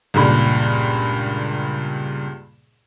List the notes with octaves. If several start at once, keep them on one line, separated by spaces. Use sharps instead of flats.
C#2 G2 A#2 B5